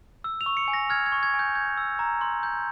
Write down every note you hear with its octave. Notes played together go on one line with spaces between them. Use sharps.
E6
F7
C#6
C#7
G#5
A#6
F6 G#6
G#6
C#6
G#6
G#5
G6
G6 G#6
E6
A#5
C6
G6